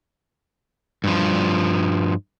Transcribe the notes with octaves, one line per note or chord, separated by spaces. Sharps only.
G2 F3